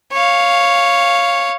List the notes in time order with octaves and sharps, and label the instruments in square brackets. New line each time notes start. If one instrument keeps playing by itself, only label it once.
[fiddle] C#5 F5